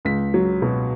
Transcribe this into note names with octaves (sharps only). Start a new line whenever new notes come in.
C#2 B6
F#3
B2